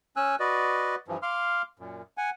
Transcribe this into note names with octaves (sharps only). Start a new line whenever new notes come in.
C#4 G#5 E6 F#6
F#4 B4 D5 D#5
G2 E3 F3
F5 C6 D6 F6
F#2 A#2
F#5 G#5